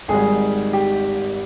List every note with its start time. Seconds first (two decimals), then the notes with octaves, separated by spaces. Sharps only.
0.08 G#1 G#2 G3 G#4 G#5
0.73 G4 G5